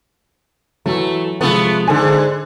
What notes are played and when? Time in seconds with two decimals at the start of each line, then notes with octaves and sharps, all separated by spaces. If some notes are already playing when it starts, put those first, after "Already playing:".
0.86 E3 F#3 A3
1.41 C3 F3 G#3 A3 B3
1.87 G#2 D3 G#4 A4 G#5